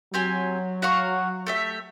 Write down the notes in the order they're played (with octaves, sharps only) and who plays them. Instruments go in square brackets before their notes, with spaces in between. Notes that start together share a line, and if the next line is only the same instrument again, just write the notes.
[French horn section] F#3 [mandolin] C4 G4 G#5
[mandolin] F#4 F5 C#6
A3 G4 E5